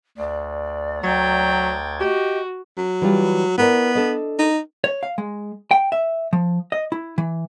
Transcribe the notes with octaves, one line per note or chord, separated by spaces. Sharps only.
D2 D5
D2 F#3 G5 A#5 G#6 A6
F#4 G4 D#5
F#3
E3 G3 F4
B3 E4 A#4 D5
D4 A4 D#5
D#4
C#5
F5
G#3
G5
E5
F3
D#5
E4
E3